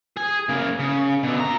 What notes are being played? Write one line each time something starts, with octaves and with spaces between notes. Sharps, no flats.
G#4 G#5
C#3 A#3
C#3
B2 D3
A#2 A#5